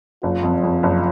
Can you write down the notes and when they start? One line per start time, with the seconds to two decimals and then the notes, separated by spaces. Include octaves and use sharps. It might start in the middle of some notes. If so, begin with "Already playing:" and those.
0.23 F#1 F4
0.43 F2
0.64 F2
0.83 F#1